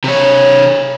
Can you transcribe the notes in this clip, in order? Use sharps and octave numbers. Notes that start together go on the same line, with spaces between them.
C3 C#5